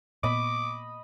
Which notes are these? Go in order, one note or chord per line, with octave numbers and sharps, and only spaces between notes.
A#2 B3 D#5 B5 D6